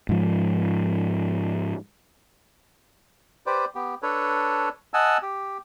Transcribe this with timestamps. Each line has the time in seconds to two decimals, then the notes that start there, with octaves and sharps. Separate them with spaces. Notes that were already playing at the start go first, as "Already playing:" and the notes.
0.09 G#2 F3
3.46 G4 B4 C5 D5
3.75 B3 G4
4.03 D4 A4 B4 C#5
4.94 D#5 F#5 G#5 A5 E6
5.22 G4